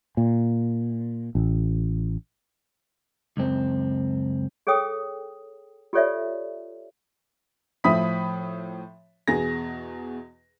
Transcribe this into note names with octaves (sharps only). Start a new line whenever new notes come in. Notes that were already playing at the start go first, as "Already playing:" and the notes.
A#2
A1
C#2 F#2 C4
G#4 A4 C#5 G5 D#6
F4 G4 A4 C#5 D5 E5
A2 F3 E5 B5 D#6 B6
E2 B2 G#4 A#6